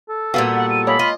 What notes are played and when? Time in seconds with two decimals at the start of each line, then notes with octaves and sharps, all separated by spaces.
0.09 A4
0.34 A#2 G3 B3 F#4 F5 E6
0.56 F#5
0.70 D#7
0.87 G#3 A#3 C#5 B5
0.99 F4 D#5